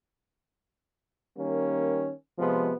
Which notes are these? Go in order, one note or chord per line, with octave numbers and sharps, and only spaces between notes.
D#3 G3 A#3 C#4
C3 F3 G#3 B3